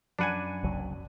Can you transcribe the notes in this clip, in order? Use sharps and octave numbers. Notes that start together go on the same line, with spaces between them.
F#2 D4 F#5 G#5 B5 D#7
F#1 C2 F#3